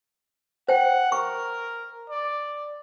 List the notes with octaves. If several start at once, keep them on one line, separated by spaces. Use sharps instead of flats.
C5 F#5 G5
A#4 C#6
D5